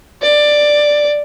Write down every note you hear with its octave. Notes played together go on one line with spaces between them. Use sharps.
D5